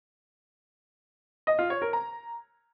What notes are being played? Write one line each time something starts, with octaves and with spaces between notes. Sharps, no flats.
D#5
F4
C#5
A#4
A#5